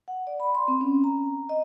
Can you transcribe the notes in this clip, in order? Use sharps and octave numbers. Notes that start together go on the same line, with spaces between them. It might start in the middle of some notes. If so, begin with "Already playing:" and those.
F#5
D5
B5
C6
C4
C#4
A#5
D#5